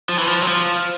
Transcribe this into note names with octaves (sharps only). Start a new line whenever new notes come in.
F3
E3
F3
F#3
F3